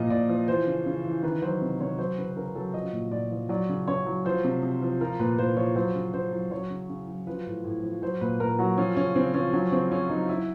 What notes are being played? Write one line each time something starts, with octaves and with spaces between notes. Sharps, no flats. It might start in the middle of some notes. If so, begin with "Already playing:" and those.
Already playing: A#2 F3 D#5
A#2 D5
F3
E3 C5
C#3
C#3
E3
D#3 B4
F#3 C5
C3
C3 C#5
F#3 C5
C#3 B4
B4
C#3 A#4
F#3 A4
F3 D#5
A#2
A#2 D5
F3
F#3 D5
C#3
C#3 C#5
F#3
F3 C5
C3
C3
F3
F3 A#4
A#2 B4
A#2 C5
F3 C#5
F#3 C5
C#3
C#3 C5
F#3
F#3 C#5
C#3
C#3
F#3
F3 B4
A2
A2
F3
F#3 C5
A#2 B4
A#2 A#4
F#3 F#4
F3 C#4
C#3 C#4
C#3 C4
F3 C#4
F#3 C#4
C#3 C4
C#3 C#4
F#3 D#4
F#3 E4